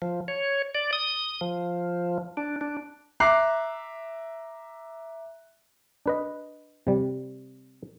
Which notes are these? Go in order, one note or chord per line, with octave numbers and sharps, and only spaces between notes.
F3
C#5
D5
D#6
F3
D4
D4
E5 A#5 D6 F#6 C7
D4 B4 D#5
C3 G3